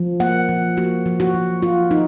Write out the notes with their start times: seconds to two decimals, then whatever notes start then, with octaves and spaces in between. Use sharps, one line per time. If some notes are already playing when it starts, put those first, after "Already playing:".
Already playing: F3
0.20 A#3 F#5
0.49 F3
0.77 A#3 F#4
1.06 F3
1.20 F#4
1.34 F3
1.62 F3 F4
1.91 D#4